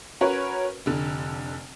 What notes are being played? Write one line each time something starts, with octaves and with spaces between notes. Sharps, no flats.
C#4 F#4 A#4 B4 C#5
F1 D3